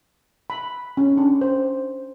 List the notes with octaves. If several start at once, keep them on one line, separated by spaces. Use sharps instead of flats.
B5
C#4
D4
C5